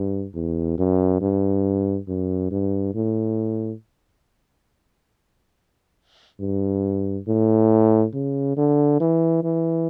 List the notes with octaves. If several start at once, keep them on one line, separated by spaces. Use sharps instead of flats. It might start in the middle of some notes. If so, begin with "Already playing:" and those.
Already playing: G2
E2
F#2
G2
F#2
G2
A2
G2
A2
C#3
D3
E3
E3